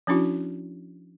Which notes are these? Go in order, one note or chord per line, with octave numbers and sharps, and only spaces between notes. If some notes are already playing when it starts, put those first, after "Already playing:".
F3 C#4 D4 E4 F#4